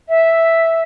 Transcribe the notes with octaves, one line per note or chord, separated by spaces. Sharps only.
E5